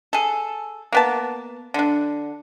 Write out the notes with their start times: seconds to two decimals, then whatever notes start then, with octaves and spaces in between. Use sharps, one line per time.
0.13 G#4 A4
0.93 A#3 B3 A5
1.74 D3 D4